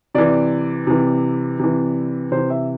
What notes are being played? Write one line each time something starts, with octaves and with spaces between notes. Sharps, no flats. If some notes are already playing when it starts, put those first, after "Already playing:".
C3 E3 D5
C3 E3
C3 E3
C3 E3 C5
E5